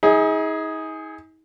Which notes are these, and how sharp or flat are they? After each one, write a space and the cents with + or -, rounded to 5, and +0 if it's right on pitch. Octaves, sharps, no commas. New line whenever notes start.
D#4 +40 G#4 +0